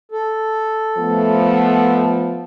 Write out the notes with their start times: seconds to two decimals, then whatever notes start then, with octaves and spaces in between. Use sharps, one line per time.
0.11 A4
0.97 F3 A3 B3